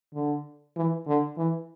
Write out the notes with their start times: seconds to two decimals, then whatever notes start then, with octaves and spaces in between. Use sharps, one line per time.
0.14 D3
0.77 E3
1.07 D3
1.37 E3